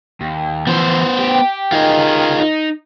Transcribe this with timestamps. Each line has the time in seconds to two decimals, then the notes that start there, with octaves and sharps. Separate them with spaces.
0.21 D#2
0.67 E3 F3 B3 C5
1.19 G4
1.72 D#3 F4 G#4 D#5
2.40 D#4